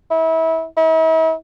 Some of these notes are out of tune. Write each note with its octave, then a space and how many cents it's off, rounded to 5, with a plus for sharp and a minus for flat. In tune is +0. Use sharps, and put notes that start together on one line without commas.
E4 -30
E4 -45